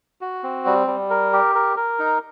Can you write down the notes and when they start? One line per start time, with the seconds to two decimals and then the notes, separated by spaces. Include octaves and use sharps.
0.21 F#4
0.43 C4
0.66 G3
0.87 G3
1.10 A#4
1.33 G4
1.55 A#4
1.77 A#4
1.99 D#4